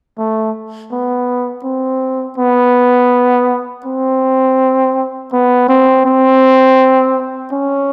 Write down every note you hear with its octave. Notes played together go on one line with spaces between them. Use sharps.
A3
B3
C4
B3
C4
B3
C4
C4
C#4